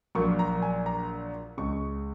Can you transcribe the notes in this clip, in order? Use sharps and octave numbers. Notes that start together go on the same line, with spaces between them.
A#1 A#2 F#3 A#3 C#6
A#5
G#5
A#5
C#2 C#3 G#3 C#6